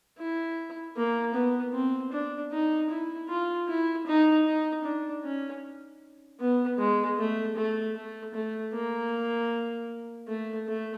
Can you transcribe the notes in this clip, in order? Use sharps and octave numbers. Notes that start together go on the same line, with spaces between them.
E4
A#3
B3
C4
D4
D#4
E4
F4
E4
D#4
D#4
D4
C#4
B3
G#3
A3
A3
A3
A3
A#3
A3
A3